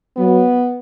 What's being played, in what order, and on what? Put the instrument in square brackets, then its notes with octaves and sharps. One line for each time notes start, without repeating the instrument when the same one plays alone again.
[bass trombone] F#3 [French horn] B3